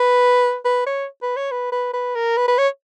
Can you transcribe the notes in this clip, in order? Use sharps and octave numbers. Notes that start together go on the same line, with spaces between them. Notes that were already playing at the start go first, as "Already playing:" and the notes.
Already playing: B4
B4
C#5
B4
C#5
B4
B4
B4
A#4
B4
B4
C#5